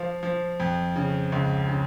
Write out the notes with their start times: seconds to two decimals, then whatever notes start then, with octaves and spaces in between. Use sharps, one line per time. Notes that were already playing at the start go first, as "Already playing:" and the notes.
Already playing: F3 F5
0.23 F3
0.60 F2
0.96 C#3
1.32 C#2
1.69 C#3